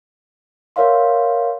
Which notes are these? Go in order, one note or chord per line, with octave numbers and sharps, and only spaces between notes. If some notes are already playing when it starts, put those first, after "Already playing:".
A#4 B4 C#5 E5 F5 C6